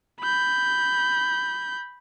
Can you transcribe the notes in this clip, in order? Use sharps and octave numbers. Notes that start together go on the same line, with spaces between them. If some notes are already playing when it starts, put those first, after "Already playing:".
B5 G6